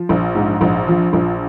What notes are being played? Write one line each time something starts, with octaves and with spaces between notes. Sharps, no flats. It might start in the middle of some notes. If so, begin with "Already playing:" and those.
Already playing: F3
A#1
G#2
A#1
F3
A#1